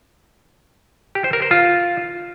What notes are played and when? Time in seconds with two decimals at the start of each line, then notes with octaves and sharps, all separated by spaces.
1.15 G4
1.24 C5
1.33 A#4
1.42 C5
1.51 F4